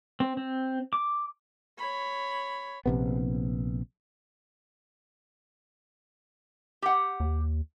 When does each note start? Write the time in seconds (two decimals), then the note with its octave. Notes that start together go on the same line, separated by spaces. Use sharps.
0.20 C4
0.37 C4
0.93 D6
1.78 C#5 B5
2.86 A#1 C3 B3
6.82 G4 F#5
7.20 D#2